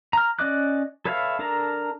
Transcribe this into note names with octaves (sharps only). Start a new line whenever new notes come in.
A#5 F6
C#4 D5 D#5 D6 F#6
A4 B4 C#5 E5 F5
D4 A4 A#4 A#5